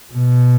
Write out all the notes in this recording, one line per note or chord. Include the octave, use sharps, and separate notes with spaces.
B2